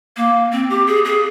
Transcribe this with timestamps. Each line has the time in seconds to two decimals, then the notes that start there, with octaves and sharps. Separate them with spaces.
0.17 A#3
0.52 C4
0.70 G4
0.87 G#4
1.05 G#4